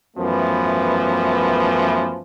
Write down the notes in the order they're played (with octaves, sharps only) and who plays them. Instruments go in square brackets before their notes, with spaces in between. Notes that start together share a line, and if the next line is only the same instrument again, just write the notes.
[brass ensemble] F#2 E3 F3 A3 B3